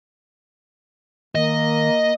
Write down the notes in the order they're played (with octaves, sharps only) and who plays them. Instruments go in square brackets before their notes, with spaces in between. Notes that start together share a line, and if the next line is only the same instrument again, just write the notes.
[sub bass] D#3 [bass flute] A#3 [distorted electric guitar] D#5